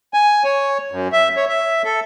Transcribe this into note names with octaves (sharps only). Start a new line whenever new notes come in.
G#5
C#5
F#2
E5
C#5
E5
A4